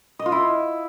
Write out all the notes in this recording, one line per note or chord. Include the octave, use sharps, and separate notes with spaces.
D#5
F4
E4